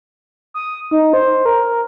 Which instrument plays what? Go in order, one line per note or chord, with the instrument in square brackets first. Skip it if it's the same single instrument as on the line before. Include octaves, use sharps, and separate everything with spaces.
[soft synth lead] D#6
D#4
C5
A#4